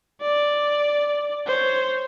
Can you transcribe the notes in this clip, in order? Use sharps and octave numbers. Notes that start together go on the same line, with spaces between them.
D5
C5 C#5